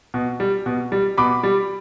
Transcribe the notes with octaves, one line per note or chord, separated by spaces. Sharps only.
B2
G3
B2
G3
B2 B5 D6
G3